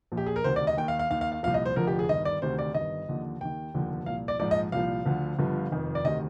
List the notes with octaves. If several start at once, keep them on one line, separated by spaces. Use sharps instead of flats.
A#1 A#2 F3
G4
G#4
A#4
D2 C3 D#3 C5
D5
D#5
D#2 D#3 G5
F5
F5
D#2 D#3 F5
F5
F5
C2 A#2 F3 F5
D#5
C5
F1 F2 D3 F3 A#4
G4
G#4
G1 G2 D#3 D#5
D5
D2 C3 D#3 C5
D5
G1 G2 D#3 D#5
D#2 D3 F3
D#2 D#3 G5
F1 D#2 D3 F3
C2 A#2 F3 F5
D5
A#1 G#2 F3 D5
D#5
C2 A#2 F3 F5
D2 D3 F3
G1 G2 D3 F3
F1 F2 D#3
D5
D2 C3 D#3 D#5